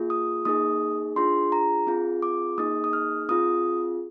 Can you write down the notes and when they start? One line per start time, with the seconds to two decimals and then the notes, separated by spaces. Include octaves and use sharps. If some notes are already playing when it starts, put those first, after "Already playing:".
Already playing: A#3 F4 G#4
0.10 D#6
0.45 A#3 D#4 G#4 D#6
1.16 D4 F4 G#4 C6
1.52 A#5
1.87 C4 F4 G#4
2.22 D6
2.58 A#3 D#4 G#4 D#6
2.84 D#6
2.93 F6
3.29 C4 F4 G#4 D#6